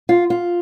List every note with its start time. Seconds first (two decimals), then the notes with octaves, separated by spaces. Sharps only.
0.09 F4
0.30 F4